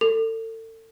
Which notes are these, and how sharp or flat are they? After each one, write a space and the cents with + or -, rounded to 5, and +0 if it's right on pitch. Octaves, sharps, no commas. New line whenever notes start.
A4 +35